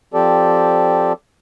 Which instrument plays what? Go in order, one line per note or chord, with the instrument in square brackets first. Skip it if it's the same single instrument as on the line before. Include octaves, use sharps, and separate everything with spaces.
[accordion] F3 C4 G4 A4 D5